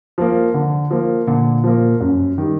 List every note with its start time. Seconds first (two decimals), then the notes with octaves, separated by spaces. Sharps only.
0.18 F3 A#3
0.54 D3
0.91 F3 A#3
1.27 A#2 D3
1.64 F3 A#3
2.01 F#2
2.38 D#3 G3